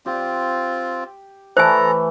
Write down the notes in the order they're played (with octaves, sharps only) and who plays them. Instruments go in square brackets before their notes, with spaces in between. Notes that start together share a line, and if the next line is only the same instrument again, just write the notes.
[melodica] C4 F4 [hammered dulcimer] G4
[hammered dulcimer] E3 A3 [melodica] A4 A#5 [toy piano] C5 G#5